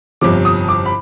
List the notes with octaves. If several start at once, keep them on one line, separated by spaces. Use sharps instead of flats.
G1 F2 C3 F3 D6
D#6
D6
B5